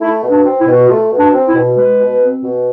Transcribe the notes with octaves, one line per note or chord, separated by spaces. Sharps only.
A3 E4
B2
D4
C4
E4
B2
A3 F4
B2
D4
C4
E4
B2
G#3 B4
B2
C4
B2